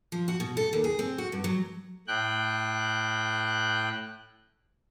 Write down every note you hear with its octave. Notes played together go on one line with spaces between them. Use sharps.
F3
F#4
B2
A4
D#2
G#4
C4
F#4
G2
F#3
A2 G5 F#6